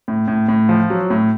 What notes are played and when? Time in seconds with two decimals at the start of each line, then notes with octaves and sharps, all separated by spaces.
0.08 A2
0.28 A2
0.48 A2
0.69 F3
0.90 F#3
1.10 A2